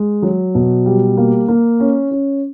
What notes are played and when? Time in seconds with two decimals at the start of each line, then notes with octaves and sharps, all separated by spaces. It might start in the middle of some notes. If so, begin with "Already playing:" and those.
Already playing: G#3
0.22 F#3
0.55 B2
0.86 G3
1.17 A#3
1.48 A#3
1.80 C#4
2.11 C#4